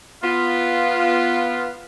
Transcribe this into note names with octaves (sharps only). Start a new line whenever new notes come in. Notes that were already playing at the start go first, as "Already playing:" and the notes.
B3 F4